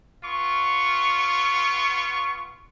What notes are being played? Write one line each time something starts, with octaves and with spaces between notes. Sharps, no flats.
B3 F4 C#6